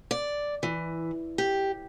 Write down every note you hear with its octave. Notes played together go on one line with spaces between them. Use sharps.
D5
E3
G4